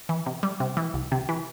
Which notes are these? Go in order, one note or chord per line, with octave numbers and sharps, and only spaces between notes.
E3
C3
G3
C3
E3
C2
C3
E3